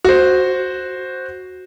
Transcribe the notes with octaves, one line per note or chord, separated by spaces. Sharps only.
F#4 C5